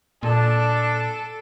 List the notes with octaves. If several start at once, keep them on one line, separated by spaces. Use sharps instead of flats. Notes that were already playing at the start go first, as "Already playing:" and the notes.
A#2 D4 A4